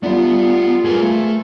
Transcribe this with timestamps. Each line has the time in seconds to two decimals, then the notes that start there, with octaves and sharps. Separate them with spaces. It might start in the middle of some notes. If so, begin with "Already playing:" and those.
0.03 G3 A3 B3 D4 F4
0.84 A2 G#4 A#4 B4
1.01 A3